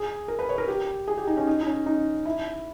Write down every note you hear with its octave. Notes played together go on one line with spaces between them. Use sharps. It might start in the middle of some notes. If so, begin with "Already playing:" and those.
Already playing: G#4
A#4
B4
C#5
A#4
G4
G#4
G4
D#4
C#4
D#4
D#4
C#4
D#4
E4